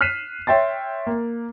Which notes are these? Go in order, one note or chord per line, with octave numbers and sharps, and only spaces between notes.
F6 F#6 B6 C7 D#7 E7
C#5 E5 G5 C6 A6
A#3